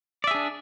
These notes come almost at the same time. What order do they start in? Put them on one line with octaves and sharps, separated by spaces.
D5 E5 G#4 D4